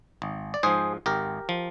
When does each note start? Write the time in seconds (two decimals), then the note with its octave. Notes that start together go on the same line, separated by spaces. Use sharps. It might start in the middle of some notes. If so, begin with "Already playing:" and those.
0.22 G#1
0.54 D5
0.63 G#2 F3 G#4 C5
1.06 G#1 G4 A#4
1.49 F3